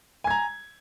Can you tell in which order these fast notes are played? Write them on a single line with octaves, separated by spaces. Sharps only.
G#5 G#6 A#5